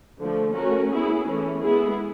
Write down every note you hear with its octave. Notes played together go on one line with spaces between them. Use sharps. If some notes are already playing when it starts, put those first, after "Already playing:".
D3 F3 A3
A3 C#4 F#4 A#4
B3 E4 G#4
E3 A3 C#4
G#3 B3 E4 G#4